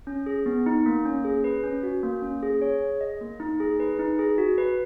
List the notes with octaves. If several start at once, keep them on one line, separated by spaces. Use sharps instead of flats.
C#4
G#4
B3
D#4
A#3
C#4
G#4
B4
C#4
F#4
A#3
C#4
G#4
C#5
G#4
D#5
A#3
D#4
G#4
B4
D#4
G#4
F#4
B4